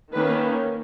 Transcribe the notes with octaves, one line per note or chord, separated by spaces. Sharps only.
D#3 A#3 C#4 B4